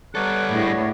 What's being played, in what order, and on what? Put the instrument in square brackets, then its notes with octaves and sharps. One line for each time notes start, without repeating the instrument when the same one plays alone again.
[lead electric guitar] G3 A4 [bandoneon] B3 C#5 D5 [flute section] A#5 F6 F#6
[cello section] A2 [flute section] D4 G#4